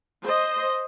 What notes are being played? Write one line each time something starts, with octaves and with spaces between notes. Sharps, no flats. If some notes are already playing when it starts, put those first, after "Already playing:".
C5 D#5